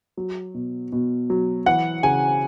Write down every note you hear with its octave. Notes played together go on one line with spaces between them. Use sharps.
F#3
B2
B2
F#3
E3 F#5
C#3 G#5